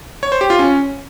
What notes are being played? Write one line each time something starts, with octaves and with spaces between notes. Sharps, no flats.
C#5
C5
G4
F4
C#4